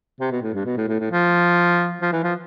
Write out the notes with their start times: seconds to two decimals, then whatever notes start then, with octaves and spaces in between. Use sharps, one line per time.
0.20 C3
0.31 B2
0.42 A2
0.54 G2
0.65 B2
0.77 A2
0.88 A2
1.00 A2
1.11 F3
2.01 F3
2.12 E3
2.24 F3